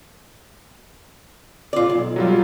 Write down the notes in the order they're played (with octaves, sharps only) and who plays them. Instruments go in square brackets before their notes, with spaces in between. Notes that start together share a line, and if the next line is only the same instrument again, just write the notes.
[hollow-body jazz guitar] F4 D5
B1
[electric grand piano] F#3 G3 F4